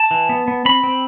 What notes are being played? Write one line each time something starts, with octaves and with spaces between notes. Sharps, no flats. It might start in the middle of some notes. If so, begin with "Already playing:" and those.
Already playing: A5
E3
B3
B3
C4 B5
C4